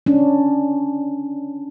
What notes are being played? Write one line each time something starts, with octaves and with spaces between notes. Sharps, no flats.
C#4 D4